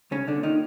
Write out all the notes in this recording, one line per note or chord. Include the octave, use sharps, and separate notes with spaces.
C2 C#3 C#4
D3 D4
A#2
D#3 D#4